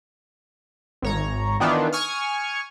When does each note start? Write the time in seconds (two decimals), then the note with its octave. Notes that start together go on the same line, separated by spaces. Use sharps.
1.02 G#1 C#5 A#5
1.60 D#3 E3 B3 D4 D#4 F4
1.93 G#5 C#6 D#6 F6